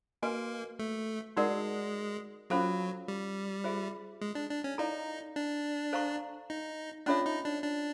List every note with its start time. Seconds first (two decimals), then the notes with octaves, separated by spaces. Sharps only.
0.23 A#3 F#4 B4 D#5 G#5
0.79 A3
1.37 G#3 D#4 F#4 A#4 D5 F#5
2.50 F#3 C#4 F4 A4 C5 F5
3.08 G3
3.64 F4 G#4 C5 E5
4.21 G#3
4.35 D4
4.50 D4
4.64 C#4
4.78 D#4 E4 A4 D5 F5 A#5
5.36 D4
5.93 A4 C5 F5 A#5 C#6
6.50 D#4
7.06 C#4 D4 F4 A4 C#5 E5
7.26 D#4
7.45 D4
7.63 D4